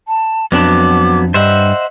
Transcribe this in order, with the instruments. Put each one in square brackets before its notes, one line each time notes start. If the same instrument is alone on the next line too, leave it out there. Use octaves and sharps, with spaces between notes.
[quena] A5
[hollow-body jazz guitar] F2 D4 [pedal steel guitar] F#3 B3 [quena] D6
[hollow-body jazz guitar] G2 [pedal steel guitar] C5 E5 F#5 [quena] D#5